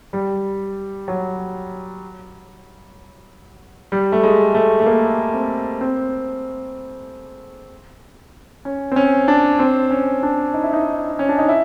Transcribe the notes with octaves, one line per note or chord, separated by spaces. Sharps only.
G3
F#3
G3
A3
G#3
A3
A3
A#3
C4
C4
C#4
C4
C#4
D4
C4
C#4
D4
D#4
E4
D#4
C#4
D4
D#4
E4